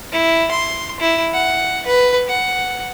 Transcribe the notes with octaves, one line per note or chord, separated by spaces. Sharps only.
E4
C6
E4
F#5
B4
F#5